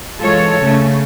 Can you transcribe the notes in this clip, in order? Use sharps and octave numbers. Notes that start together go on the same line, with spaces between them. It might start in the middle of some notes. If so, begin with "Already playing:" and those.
E3 G#3 F4 A4 C#5
C#3 A3 C#4